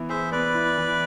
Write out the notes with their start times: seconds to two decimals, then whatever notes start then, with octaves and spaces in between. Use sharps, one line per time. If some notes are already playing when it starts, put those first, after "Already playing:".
Already playing: E3 B3 E4
0.09 G#4 C5 E5
0.32 B3 B4 D5
0.55 E4
0.78 E3